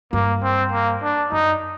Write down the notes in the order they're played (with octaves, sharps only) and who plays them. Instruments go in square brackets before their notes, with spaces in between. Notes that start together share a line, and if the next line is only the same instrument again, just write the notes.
[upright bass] G2 [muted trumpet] A#3
[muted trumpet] C4
A#3
D4
[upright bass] F#2 [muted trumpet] D#4